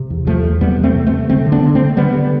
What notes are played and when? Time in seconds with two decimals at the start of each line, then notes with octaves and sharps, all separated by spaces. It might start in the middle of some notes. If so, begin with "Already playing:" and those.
Already playing: C3
0.10 E2
0.27 E2 F3 A3
0.44 E2
0.61 C3 G3 B3
0.78 E2
0.83 A3 C4
0.95 C3
1.07 A3 C4
1.12 C3
1.29 D3 A3 C4
1.46 D3
1.52 B3 D4
1.63 D3
1.75 A3 C4
1.80 D3
1.97 D3 G3 B3
2.14 D3